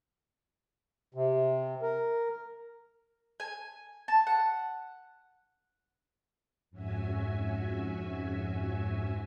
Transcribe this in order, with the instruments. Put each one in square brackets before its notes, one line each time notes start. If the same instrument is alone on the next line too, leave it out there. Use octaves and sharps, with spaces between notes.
[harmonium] C3
A#4
[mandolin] G#5
A5
F#5
[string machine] F2 G#2 C#4 F#4 E5 G#5